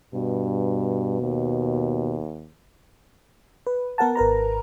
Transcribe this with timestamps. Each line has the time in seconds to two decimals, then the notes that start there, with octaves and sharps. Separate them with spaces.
0.14 G2 B2
1.21 D#2
3.67 B4
3.98 B3 A#4 F#5 A5
4.16 G#1 A#4 B4 A#5